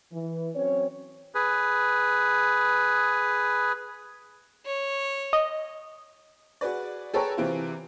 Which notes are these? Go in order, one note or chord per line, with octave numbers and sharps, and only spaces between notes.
E3
F#3 C4 C#4 C#5
G#4 B4
C#5
D#5
F#4 G#4 B4 D5
G#4 A4 B4 C#5 G5 A#5
C3 E3 C4 F4